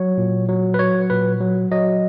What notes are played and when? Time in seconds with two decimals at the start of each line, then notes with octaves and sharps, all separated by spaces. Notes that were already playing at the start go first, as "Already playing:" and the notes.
Already playing: F#3 C#5
0.18 A#2
0.49 F#3
0.74 B4
0.79 F#3 C#5
1.10 A#2 B4
1.41 F#3
1.71 F#3 D#5